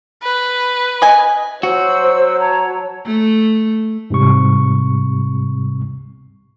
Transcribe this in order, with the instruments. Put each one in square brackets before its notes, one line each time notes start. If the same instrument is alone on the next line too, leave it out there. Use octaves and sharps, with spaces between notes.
[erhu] B4
[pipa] D#5 G#5
[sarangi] F#3 [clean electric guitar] F#4 [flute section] C5 E6
[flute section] C#5 A5 A#5
[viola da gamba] A3
[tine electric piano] G#2 C3 G3 C#6